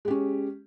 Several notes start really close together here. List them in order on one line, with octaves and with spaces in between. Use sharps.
G#3 G4 C#4